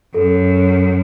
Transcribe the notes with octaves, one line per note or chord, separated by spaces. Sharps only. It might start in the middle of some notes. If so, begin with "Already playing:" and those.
F#2 A4